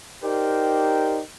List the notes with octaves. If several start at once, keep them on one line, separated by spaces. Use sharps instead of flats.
D#4 G4 A#4 C5 D5 G5